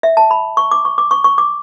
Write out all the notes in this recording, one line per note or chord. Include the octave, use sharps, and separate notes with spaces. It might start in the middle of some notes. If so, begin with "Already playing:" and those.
E5
A5
B5
C#6
D6
C#6
D6
C#6
C#6
D6